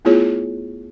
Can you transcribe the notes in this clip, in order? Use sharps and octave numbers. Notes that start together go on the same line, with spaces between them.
A3 B3 E4 F4 G#4 C#5